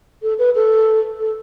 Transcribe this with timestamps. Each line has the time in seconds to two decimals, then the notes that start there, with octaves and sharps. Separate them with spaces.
0.23 A4
0.39 B4
0.55 A4
1.19 A4